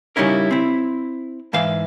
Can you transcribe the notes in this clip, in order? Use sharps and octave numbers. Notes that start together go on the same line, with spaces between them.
C#3 G3 C#4 D#4 E4 A#4
C4 E4
G#2 E3 E5 F5